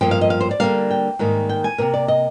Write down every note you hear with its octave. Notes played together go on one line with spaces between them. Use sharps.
G2 F3 A#3 G5
F5
D#5
F5
C5
D5
D3 G3 A#3 F5
G5
G#2 D#3 G3 A#3
G5
G#5
C3 D#3 A#3 A#4
D5
D#5